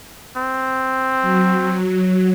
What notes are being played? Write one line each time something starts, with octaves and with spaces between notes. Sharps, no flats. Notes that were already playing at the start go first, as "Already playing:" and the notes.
C4
F#3